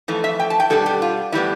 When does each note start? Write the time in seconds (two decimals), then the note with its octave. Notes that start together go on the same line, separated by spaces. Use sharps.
0.08 F2 E3 A3
0.24 E5
0.40 G5
0.50 A5
0.60 G5
0.70 B2 G3 B3 D4 A4
0.86 G4
1.02 F4
1.32 A2 E3 G3 B3 E4